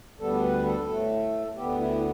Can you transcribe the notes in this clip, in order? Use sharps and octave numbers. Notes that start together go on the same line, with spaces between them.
D2 D3 G3 B3 A4
B4
A4
A2 A3
D2 D3 B3 G4
E4